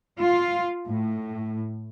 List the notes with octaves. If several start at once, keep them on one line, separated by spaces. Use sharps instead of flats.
F4
A2